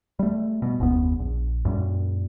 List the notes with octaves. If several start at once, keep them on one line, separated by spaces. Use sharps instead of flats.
G3 A3
B2
F#1 D#2 B3
A#1
F#2 A#2 G3